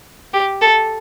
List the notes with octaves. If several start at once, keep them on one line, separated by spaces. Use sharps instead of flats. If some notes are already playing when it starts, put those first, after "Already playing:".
G4
A4